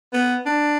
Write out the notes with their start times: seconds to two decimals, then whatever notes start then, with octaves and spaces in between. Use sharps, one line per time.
0.13 B3
0.46 D4